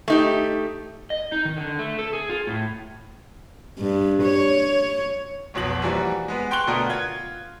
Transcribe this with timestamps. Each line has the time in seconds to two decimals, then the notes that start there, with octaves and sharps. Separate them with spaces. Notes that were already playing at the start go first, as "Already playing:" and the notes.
0.08 A3 D#4 G4
1.10 D#5
1.32 D#4
1.45 D#3
1.57 D3
1.79 A3
1.99 A4
2.13 G#4
2.29 F4
2.47 A2
3.78 G2
4.23 C#5
5.54 F1 B1 B2 F#7
5.82 E3 F3 G3 A#3 F#4
6.28 G#3 B3 B4
6.51 G5 C6 C#6 F#6 G7
6.67 B2 D3 A3 B3 F#4 A#4
6.90 F4 G#6